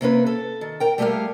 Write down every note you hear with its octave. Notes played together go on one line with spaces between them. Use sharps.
C3 A#3 C#4 B4
A4
D#3
A#4 G5
G3 A3 G4 G#4 A#4 F5